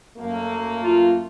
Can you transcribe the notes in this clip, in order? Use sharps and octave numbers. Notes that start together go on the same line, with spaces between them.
F#2 A3 A#3
F4